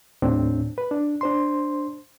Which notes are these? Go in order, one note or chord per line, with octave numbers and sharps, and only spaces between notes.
D#2 A2 C4 D4
B4
D4
D4 C5 C6